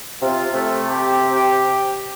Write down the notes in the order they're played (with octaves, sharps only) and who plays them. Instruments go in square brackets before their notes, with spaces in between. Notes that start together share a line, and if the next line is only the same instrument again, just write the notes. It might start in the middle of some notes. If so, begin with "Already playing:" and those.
[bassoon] C3 [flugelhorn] F4
[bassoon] C3 [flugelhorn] A3
[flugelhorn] G4
G4